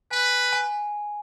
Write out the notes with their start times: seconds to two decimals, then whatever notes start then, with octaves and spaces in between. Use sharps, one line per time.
0.11 B4 G#5
0.53 G#5